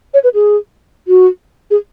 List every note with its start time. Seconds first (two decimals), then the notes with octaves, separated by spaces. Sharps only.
0.14 C#5
0.24 B4
0.34 G#4
1.08 F#4
1.70 G#4